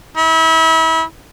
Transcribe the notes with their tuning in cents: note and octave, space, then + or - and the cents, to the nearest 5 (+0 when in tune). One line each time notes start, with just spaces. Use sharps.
E4 -35